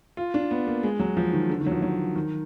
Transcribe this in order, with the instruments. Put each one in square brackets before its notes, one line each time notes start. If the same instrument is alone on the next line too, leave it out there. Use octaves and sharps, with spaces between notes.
[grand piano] F4
D4
B3
A#3
G#3
F#3
F3
D#3
D3
D#3
F#3
F3
F#3
D#3